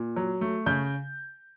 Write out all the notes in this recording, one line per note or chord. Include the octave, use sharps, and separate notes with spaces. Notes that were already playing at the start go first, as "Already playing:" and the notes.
Already playing: A#2
F#3
A3
C#3 G6